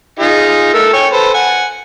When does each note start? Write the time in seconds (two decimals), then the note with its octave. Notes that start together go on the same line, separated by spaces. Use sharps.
0.20 D#4 F4 G#4
0.74 A3 A#4 E6
0.93 C#5 G5 G#5
1.12 A4 B4 C5
1.34 F#5 G#5